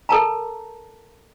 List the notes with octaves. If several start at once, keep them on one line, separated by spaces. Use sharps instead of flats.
A4 A#4 A5 A#5